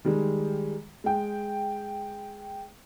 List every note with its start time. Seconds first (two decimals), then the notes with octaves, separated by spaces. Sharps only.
0.05 D#3 G3 G#3
1.04 G#3 G5